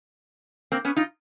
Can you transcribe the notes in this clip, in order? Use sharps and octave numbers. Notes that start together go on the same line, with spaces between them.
A#3 C4
B3 C#4
D#4 F4